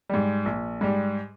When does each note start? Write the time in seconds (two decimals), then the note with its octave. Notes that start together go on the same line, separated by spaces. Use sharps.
0.09 G#2 G3
0.45 A#1
0.81 G#2 G3